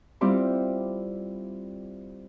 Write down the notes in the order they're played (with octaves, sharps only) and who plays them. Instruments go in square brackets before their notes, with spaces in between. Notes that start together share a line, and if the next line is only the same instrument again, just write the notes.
[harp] G3 C4 E4 F4 G4